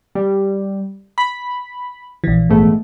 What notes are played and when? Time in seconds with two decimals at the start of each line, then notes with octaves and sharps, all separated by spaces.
0.15 G3
1.18 B5
2.24 A#1 E3
2.49 G#2 A3 B3